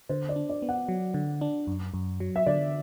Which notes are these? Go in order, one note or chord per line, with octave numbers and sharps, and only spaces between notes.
D3 C5
D5
D4
D5
B3
F#5
F#3
D3
D4
F#2
F#2
F#3
E5
D3 D5